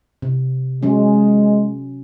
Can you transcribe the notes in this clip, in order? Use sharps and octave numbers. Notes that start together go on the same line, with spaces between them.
C3
F#3 G#3 C#4